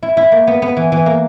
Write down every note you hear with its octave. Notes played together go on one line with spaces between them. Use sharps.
E4
E4
A#3
B3
B3
E3
E3
A#3